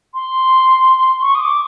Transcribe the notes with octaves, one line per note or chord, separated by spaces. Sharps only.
C6
C#6
D#6
D6